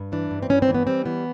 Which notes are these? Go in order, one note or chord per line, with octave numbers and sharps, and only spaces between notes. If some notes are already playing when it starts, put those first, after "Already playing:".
Already playing: G2
E3 D4
G2
C4
G2 C#4
C4
E3
B3
G3 C4
E3 B3